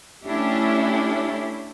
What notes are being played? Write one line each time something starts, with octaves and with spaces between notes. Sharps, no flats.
A3 C#4 D4 E4 G4